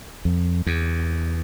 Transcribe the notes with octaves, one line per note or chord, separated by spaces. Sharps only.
F2
E2